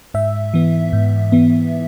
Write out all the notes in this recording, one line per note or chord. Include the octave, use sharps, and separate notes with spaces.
G#2 E5
E3 B3
G#2
E3 B3